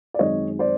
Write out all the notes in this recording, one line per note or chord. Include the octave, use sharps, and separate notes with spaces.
D5
F#2 D#3 G#3 C4 C#5 D#5
C5 D5